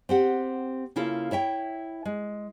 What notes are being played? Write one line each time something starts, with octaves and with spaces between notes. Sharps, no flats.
C4 G4 F#5
C#3 A#3 E4 F4 A4
E4 C#5 E5 G5
G#3